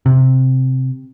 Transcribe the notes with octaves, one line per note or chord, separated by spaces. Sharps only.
C3